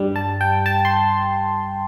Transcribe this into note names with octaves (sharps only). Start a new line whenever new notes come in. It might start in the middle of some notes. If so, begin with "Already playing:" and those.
Already playing: G2 G3
A5
G5
A5
C6